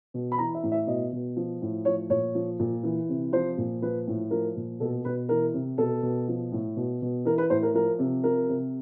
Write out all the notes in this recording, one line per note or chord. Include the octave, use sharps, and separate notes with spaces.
B2
B5
E3 A#5
E5
A2
E5
B2 D#5
B2
F3
A2
F3 C#5
A#2 C#5
F3
A#2
E3
C3
F3 C5
A#2
F3 B4
A2
F3 A#4
A#2
B2 A4
B2 B4
E3 A#4
C3
B2 A4
B2
F3
A2
B2
B2
E3 A#4
B4
A2 C5
A#4
F3 A#4
C3
F3 A#4
C3